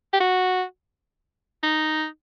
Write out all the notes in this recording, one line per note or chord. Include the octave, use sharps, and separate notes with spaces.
G4
F#4
D#4